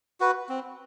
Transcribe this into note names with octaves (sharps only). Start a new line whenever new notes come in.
F#4 B4
C4